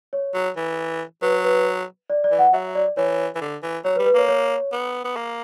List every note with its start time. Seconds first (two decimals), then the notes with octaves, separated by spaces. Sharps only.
0.13 C#5
0.34 F#3
0.56 E3
1.22 F#3 B4
1.44 B4
2.10 D5
2.24 D5
2.31 E3
2.39 F#5
2.53 F#3 E5
2.75 D5
2.97 E3 C#5
3.35 E3
3.41 D3
3.63 E3
3.85 F#3 C#5
3.96 B4
3.99 G3
4.06 B4
4.14 A#3 C#5
4.28 C#5
4.72 B3
5.04 B3
5.16 A#3